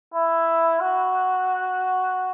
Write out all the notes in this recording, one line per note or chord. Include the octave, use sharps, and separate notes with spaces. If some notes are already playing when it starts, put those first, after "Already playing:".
E4
F#4